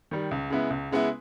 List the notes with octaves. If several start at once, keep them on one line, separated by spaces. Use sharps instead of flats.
D#3 G3
C#2
C#3 G#3 B3 E4
C#2
C#3 G#3 B3 E4